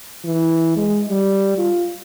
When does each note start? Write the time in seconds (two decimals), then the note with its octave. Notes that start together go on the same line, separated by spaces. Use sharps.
0.24 E3
0.77 G#3
1.09 G3
1.58 F4